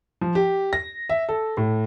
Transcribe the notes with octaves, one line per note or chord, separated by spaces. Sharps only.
F3
G4
A#6
E5
A4
A2